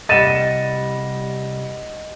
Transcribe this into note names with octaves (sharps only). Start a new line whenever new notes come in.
C2 G#2 G3 D#5 F#5 A6 D#7 E7